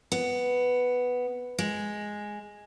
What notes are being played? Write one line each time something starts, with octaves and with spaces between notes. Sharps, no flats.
B3
G#3